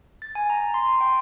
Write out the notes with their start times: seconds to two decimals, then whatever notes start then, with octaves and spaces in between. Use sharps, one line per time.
0.22 A6
0.35 G#5
0.50 A#5
0.74 C6
1.01 G5